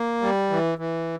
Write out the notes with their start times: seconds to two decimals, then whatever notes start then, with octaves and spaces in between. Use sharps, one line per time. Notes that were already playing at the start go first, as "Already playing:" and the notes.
Already playing: A#3
0.22 G3
0.50 E3
0.78 E3